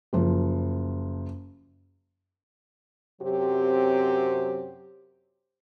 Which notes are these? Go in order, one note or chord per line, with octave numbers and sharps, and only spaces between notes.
F#1 F3
F#2 C3 F#3 C4 G4